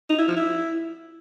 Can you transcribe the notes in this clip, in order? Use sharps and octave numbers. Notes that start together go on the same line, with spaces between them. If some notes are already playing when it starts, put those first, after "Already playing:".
D#4
E4
F3
E4